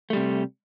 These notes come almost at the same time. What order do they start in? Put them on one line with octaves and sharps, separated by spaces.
A3 G3 C3